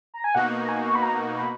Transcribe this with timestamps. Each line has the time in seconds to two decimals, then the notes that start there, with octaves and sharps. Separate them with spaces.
0.14 A#5
0.24 G#5
0.35 B2 A#3 D#4 F#4 F#5
0.62 A#5
0.68 G#5
0.88 C#6
0.95 B5
1.03 A#5
1.36 B5